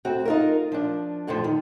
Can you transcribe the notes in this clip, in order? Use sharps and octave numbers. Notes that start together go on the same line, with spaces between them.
D2 C4 F#4
D#4 F4 A#4
F3 D4
F2 A2 D3 F3
D#3